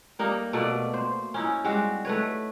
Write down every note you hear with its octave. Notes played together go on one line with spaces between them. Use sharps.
G3 A#3 D#4
B2 A3 A#3 D5
C5
C#4 D#4 E4
G3 G#3 C4 F#4
A3 B4 C#5